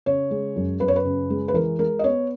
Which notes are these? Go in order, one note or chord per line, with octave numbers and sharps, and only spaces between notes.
C#3 C#5
G#3
F#2
F#2 B4
C#5
B4
C#3
G#3
B4
E3 A#4
G#3 A#4
D#5
B3 C#5